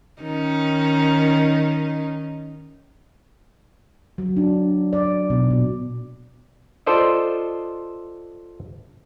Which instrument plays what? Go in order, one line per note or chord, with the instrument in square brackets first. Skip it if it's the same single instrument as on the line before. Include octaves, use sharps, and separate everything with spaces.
[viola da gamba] D#3 C#4 D#4
[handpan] F#3
D4
D5
B2
A#2
[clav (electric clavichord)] F4 A4 C5 D5 D#5